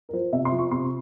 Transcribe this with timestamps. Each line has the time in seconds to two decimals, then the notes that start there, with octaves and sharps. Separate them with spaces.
0.09 A#4
0.13 F3 C5
0.32 C3 E5
0.45 C6
0.52 F3
0.59 C#6
0.71 C3 C6